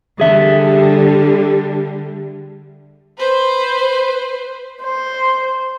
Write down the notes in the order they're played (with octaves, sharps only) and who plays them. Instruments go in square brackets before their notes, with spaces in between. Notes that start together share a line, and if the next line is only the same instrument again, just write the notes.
[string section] D3 G3 [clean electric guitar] G#4 E5
[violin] B4 C5
[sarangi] C5